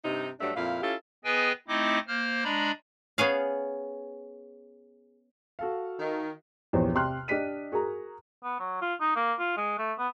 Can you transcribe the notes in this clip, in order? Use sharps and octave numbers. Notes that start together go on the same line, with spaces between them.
G2 C3 D#4
G2 F#3 A3 D4
F2 A#2 E4 F5
C#4 E4 F4 G4 A4
B3 G#4 B4 D#5 G5 G#5
A3 C4 D#4 E4 D#5 D6
A#3 C5 F6
G#3 D4 D5 A#5 B5
B3 C#4 G#4 F5
F#4 A4 F5
D#3
A#1 E2 B3 G4 C5 C#5
C3 G4 C6 F6 F#6
D4 G4 D#5 B6 D#7
F#4 G#4 A#4 A#5
B3
F#3
F4
D#4
A#3
F4
G#3
A3
B3